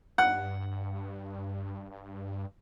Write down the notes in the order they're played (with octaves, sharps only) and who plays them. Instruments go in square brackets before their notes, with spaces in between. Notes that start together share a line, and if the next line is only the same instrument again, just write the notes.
[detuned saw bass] G2 [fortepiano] F#5